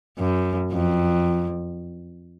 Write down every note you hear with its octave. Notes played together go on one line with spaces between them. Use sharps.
F#2
F2